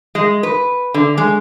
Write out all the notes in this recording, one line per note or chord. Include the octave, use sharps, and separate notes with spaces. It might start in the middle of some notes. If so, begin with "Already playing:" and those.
G#3
B4
D3
G#3